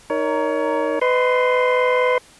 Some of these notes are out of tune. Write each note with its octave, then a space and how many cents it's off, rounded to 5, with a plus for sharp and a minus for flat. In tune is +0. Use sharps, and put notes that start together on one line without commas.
D#4 +0 A#4 +5 C#5 +25
B4 +25 D#5 +0 C6 +0